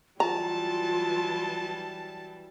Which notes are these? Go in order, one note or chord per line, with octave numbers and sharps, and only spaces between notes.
E3 F#3 G3 F4 A5 A#5